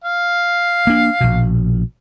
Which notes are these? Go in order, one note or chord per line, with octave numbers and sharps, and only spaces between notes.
F5
A#3 D4
A#1 B2